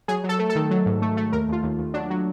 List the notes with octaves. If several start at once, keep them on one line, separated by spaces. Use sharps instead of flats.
F#3 G#4
F#3
A4
A3
A4
D#3
F#3
G#2
A3
A3
D#2 A#4
D#2 F4
D#2
D#2
F#3 D4
F#3